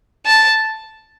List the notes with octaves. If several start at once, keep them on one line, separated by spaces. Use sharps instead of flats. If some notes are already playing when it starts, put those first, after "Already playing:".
A5